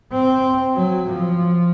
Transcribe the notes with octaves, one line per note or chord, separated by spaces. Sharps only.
C4
F#3
F3